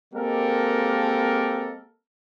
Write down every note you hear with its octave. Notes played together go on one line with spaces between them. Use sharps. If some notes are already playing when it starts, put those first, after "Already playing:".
G#3 A#3 C4 G4 A4 A#4